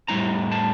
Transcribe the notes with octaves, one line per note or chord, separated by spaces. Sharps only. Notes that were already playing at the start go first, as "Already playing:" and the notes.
A2 G3 C#4 E4 A#5
A5